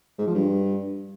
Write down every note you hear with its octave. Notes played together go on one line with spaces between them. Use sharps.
G#2
F3
G2